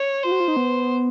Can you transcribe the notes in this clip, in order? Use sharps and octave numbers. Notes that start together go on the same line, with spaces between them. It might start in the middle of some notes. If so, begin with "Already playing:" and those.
Already playing: C#5
F4 C5
F#4
F4
D#4
B3